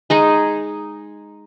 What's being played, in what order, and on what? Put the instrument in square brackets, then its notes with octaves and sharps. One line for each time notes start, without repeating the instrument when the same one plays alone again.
[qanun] G#3 D#4 G#4